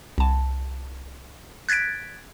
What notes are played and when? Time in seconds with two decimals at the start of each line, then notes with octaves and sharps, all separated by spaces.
0.18 C2 A5
1.69 F#6 G#6 A6 B6 D7